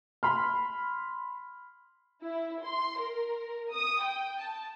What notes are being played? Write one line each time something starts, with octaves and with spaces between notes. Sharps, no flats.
B5 C6 F6
E4
C6
A#4
D#6
G5
A5